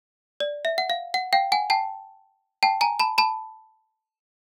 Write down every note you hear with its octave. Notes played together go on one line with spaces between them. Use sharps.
D5
E5
F#5
F5
F#5
F5 G5
F#5 G#5
G5 A5
G5 A5
G#5 A#5
A5 B5
A5 B5